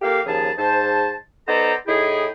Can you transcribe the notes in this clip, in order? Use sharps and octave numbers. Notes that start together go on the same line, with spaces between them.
A#3 G4 A4 F5
D#2 C#3 F3 G#4 A5
G#2 C5 A5
B3 D#4 A4 C5 D5 A#5
A2 D#4 E4 G4 G#4